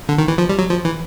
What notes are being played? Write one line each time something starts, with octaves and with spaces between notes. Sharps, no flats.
D3
D#3
E3
F3
G3
F#3
F3
E3